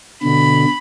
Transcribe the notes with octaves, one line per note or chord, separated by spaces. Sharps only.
B2 D3 B5